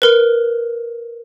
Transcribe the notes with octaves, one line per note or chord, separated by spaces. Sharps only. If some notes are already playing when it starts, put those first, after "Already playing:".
A#4 B4